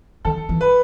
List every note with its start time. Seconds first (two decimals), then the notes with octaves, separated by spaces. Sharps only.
0.25 D#3 A4
0.49 E3
0.61 B4